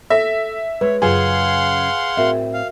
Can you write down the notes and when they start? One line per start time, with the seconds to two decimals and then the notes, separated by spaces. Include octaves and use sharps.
0.10 A4 E5 A#6
0.81 G#3 B4 C#5
1.02 F#2 C#3 F4 G#4 F5 F#5 C6
2.17 A2 A3 C4 F#4 A#4 E5
2.54 F5